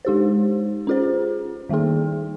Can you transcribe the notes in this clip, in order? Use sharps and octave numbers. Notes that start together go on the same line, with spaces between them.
G#3 D#4 G4 C5
C#4 F4 G#4 C5
D#3 G3 A#3 D#4 G#4